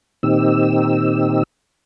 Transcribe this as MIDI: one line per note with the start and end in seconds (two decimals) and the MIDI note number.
0.23 1.43 46
0.23 1.43 51
0.23 1.43 60
0.23 1.43 63
0.23 1.43 67
0.23 1.43 88